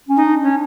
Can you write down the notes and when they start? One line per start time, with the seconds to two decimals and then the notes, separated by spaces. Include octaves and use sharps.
0.09 C#4
0.16 D#4
0.25 D4
0.43 C#4